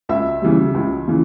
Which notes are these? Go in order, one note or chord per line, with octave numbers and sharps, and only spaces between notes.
C#2 E5
C#3 E3 G3
C#2
C#3 E3